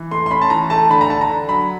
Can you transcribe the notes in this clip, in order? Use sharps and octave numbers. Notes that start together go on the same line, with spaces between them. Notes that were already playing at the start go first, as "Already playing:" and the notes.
Already playing: E3
A3 C6
C6
C#4 B5
A5
E3 A#5
A3 A5
D3 B5
A#5
D3 A5
A#5
D3
F#3 B5